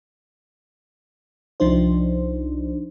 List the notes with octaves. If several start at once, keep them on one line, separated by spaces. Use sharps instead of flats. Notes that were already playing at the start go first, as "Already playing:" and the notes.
C2 F3 D4 D#4 C5